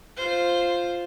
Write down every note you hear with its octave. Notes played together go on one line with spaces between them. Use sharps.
F4 C5